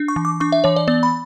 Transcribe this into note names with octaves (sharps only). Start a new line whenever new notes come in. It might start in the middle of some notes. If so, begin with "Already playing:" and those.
Already playing: D4
C#6
E3
D6
D4 C#6
E5
E3 C#5
D5
B3 D5
B5